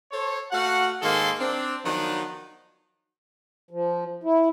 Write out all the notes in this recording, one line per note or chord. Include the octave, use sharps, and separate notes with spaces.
A4 C5 C#5
A3 F#4 F5 F#5
G#2 D#3 A#3 G#4 A4 C6
C4 D4
D#3 F3 F#3 B3 D4 D#4
F3
E4